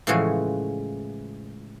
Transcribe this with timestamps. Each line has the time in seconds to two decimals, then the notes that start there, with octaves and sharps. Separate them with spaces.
0.07 A2 C#3 E3 F3 G#3 F#4